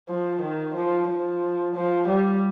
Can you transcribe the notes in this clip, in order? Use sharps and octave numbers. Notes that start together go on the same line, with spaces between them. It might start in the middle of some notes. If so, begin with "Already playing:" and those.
F3
D#3
F3
F3
F3
G3